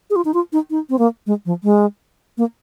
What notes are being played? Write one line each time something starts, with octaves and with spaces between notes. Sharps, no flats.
G#4
F4
D#4
F4
D#4
D#4
C4
A#3
G#3
F3
G#3
A#3